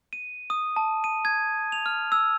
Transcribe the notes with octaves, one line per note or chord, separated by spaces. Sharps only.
D#7
D#6
A5
D#7
G#6
F7
F6
E6